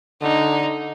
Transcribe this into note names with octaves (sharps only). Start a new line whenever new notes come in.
D3 D#4